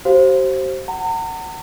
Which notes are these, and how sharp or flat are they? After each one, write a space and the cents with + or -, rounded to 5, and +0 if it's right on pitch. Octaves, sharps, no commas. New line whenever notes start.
G4 -45 C5 +15 F5 +0
F#5 +15 A#5 -40